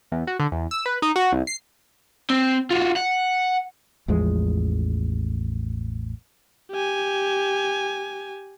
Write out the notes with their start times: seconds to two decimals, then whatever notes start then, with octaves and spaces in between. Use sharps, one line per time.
0.12 E2
0.27 F#4
0.40 D3
0.52 E2
0.71 E6
0.86 B4
1.02 D#4
1.16 F#4
1.32 C2
1.47 C7
2.30 C4
2.71 F4 F#4
2.96 F#5
4.08 A1 E2 F3 G#3
6.71 G4 G#5